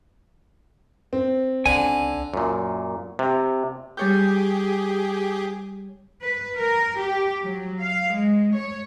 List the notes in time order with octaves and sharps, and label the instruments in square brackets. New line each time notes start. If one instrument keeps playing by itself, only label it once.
[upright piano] C4
[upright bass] C#2 [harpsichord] D3 [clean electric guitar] G#5
[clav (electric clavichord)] F#2 A#2
C3
[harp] G3 C#5 G6 [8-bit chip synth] G4 G#4
[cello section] B4
A#4
G4
F#3
F5
G#3
C#5